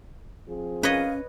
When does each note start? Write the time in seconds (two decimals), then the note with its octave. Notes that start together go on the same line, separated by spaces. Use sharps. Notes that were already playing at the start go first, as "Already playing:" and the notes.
0.47 F3 C4 G#4
0.83 C#4 B4 C#5 D#5 F5